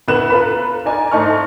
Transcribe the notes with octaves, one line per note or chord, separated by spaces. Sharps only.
D2 A2 B3 B4 F#6 E7
F4 A4 B4 A#5 B5
D#4 D5 G#5 A#5
G#2 A3 D#4 A5 C#6 F6